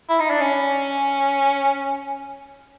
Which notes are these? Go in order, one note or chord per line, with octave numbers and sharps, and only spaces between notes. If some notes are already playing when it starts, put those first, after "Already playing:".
E4
D#4
D4
C#4